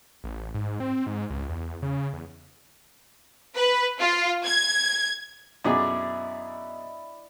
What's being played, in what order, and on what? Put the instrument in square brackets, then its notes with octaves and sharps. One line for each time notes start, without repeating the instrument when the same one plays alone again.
[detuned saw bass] A1
G#2
C4
G#2
C#2
E2
C#3
E2
[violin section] B4
F4
G#6
[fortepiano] F#2 B2 G#4 [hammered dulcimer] E4 D5 D#5